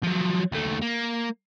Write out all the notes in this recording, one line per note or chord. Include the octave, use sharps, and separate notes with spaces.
F3 F#3
D#2 A3
A#3